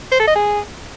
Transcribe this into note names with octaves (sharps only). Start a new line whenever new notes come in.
C5
A4
D#5
G#4